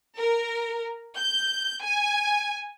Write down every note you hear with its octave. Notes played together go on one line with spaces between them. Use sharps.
A#4
G6
G#5